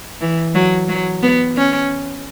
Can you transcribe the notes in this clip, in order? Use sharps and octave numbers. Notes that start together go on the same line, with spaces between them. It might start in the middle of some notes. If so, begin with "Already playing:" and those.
E3
F#3
F#3
B3
C#4